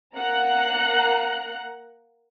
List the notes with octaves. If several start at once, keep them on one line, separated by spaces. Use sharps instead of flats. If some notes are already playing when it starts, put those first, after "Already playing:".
A#3 F#5 A#5 F#6